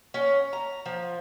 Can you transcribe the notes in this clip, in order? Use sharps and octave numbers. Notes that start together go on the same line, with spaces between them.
C#4
A#5
F3